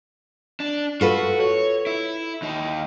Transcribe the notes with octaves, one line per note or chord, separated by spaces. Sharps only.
D4
F4 F#4 A4 B4
C#5
E4
D#2 D#4